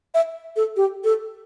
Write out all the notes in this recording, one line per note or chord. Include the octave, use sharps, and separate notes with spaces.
E5
A4
G4
A4